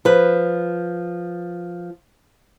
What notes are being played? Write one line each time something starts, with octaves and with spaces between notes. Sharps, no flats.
F3 B4